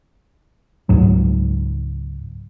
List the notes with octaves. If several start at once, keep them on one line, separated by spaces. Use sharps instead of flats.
C#2 G#2 F#3